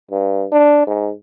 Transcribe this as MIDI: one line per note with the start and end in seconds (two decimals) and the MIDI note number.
0.11 0.47 43
0.52 0.86 62
0.87 1.12 44